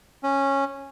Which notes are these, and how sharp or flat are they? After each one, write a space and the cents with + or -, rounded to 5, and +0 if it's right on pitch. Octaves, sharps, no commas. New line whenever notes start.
C#4 -10